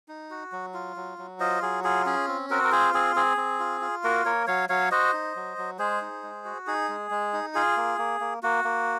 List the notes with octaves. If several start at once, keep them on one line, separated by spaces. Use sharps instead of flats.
D#4
F#4
F#3
F4
F#3
F#3
F4 C5 D#5
F#3 G#4
F4 G#4
C#4 G#4
C4
C4 F#4 A#4
A#4
F4 G#4 C5
C4 G#4
C4 G#4
C4
F4
F4
A#3 F#4 A#4
A#3 A#4 C#5
F#3 C#5 F5
F#3 C#5 F5
F#4 C5 D#5
D#4
F#3
F#3
G#3 G#4 C5
D#4
G#3
F#4
D#4 G#4
G#3
G#3
D#4
F4 G#4
A#3
A#3
A#3
A#3 F#4
A#3